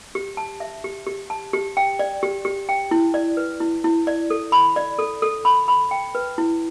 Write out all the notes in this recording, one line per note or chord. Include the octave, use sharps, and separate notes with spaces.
G4
A5
E5
G4
G4
A5
G4
G5
D5
G4
G4
G5
E4
D5
B4
E4
E4
D5
A4
B5
D5
A4
A4
B5
B5
G5
B4
E4